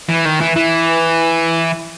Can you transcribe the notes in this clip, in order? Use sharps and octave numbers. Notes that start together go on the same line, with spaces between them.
E3
D#3
E3
E3